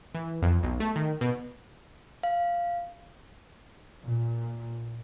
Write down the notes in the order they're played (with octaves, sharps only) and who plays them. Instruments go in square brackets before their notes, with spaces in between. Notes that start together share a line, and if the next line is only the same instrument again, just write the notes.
[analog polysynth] E3
F2
B1
A3
D#3
B2
[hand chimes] F5
[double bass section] A#2